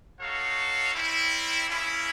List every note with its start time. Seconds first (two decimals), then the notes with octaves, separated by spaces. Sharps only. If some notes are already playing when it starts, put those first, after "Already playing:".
0.20 D#4 F#4 A4 C#5 F5
0.94 G3 C4 E4
1.67 A#3 C#4 E4 G#4